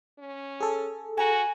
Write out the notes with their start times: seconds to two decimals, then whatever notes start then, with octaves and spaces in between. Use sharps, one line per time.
0.19 C#4
0.60 G#4 A4
1.18 F#4 G#5 A#5